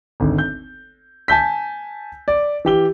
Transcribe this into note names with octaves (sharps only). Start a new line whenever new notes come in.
G#1 D2
G6
G#5 A5 G6 B6
D5
E3 G4 G7